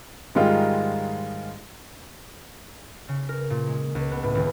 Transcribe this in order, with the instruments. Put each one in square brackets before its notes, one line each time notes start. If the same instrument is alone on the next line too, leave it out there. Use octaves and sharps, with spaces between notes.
[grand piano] G#2 D#3 G3 G#3 F4
[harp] C#3
A#4
A#2
G#3
C#2
B3
A2
D#1